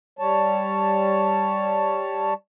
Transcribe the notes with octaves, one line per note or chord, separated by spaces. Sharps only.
G3 C#5 A5